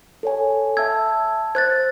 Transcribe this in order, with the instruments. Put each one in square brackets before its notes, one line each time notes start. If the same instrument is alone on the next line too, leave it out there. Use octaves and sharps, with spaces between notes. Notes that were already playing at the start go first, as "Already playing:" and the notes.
[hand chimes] A4 C#5 G#5
[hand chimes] E5 A5 E6 [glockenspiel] G#6
[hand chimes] C5 F#6 [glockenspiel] G#6 A6